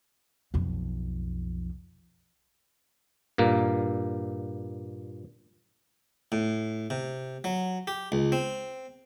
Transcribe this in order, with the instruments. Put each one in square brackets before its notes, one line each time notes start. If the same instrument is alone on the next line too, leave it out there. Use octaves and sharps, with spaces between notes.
[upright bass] B1 F2
[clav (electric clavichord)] G2 A#2 A#3
[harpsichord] A2
C3
F#3
G4
C#2
C4